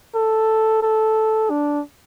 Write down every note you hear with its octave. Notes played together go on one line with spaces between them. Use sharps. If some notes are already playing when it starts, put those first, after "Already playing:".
A4
A4
D4